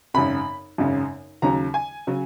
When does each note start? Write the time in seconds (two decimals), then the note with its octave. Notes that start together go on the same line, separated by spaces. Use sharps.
0.14 G#1 F#2 C#3 B5
0.78 G#1 F#2 C#3
1.42 D#2 C#3 F#3 A#5
1.74 G#5
2.07 C#3 F#3